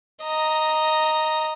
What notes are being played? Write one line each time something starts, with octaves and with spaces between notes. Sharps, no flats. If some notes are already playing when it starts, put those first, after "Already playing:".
D#5 A#5